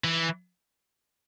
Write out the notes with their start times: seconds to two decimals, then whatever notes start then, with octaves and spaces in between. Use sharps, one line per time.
0.04 E3